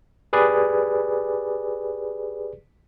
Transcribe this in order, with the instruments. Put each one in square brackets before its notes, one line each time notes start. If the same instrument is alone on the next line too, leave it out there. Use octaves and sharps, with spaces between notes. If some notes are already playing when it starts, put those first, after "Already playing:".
[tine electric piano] G4 G#4 B4 D5